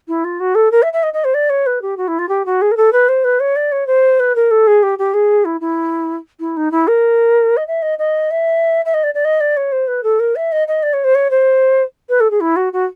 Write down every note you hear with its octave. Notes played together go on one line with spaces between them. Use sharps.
E4
F4
F#4
A4
A#4
E5
E5
D#5
D#5
C5
D5
C#5
B4
G4
F#4
E4
F4
G4
F#4
G#4
A#4
A4
B4
C5
B4
C#5
D5
C#5
C5
B4
A#4
A4
G#4
G4
G4
G#4
E4
E4
E4
D#4
E4
A#4
D#5
E5
D#5
D#5
E5
E5
D#5
D5
D5
D#5
D5
C#5
C5
B4
A4
A#4
E5
D#5
D#5
D5
C#5
C5
C#5
C5
B4
A4
G#4
E4
F#4
F#4